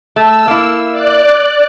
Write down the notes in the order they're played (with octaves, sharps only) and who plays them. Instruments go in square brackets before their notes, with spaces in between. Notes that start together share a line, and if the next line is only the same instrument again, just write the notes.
[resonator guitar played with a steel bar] A3 [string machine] E6
[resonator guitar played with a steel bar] A#3 E4
[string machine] D5 F#6